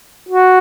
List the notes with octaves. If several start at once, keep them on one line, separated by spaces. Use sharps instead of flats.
F#4